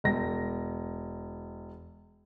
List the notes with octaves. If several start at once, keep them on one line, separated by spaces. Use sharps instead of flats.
E1 A#6